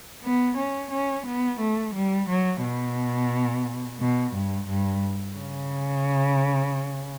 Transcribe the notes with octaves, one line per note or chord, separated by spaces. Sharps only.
B3
C#4
C#4
B3
A3
G3
F#3
B2
B2
G2
G2
C#3